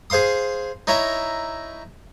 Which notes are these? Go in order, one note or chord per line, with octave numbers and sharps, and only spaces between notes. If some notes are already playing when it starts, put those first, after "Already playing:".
G#4 C5 F5 C6 D#6
D#4 E4 C#5 E5 A#5